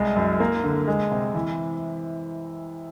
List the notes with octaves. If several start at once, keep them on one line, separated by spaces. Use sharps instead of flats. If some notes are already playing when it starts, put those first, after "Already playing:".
Already playing: C2 G#3
F#2
A#3
D3
G#3
C3
E3